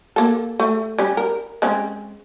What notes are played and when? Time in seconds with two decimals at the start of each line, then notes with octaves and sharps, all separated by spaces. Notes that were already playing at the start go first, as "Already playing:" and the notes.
0.16 A#3 A4
0.60 A3
0.98 G3 C#4
1.17 A#4
1.62 G#3 C4 C#4